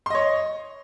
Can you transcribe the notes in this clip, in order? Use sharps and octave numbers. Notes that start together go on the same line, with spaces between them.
C#5 D#5 C6